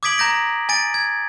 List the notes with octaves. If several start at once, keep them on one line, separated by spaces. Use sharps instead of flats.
D6 D#6 G#6 B6 D7 F#7
A#5 G6 A#6 D7
G#5 A6 D7
G#6